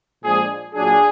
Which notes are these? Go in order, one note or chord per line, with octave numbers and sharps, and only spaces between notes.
A#2 F3 G#3 D4 G#4
A#2 F#3 D4 G#4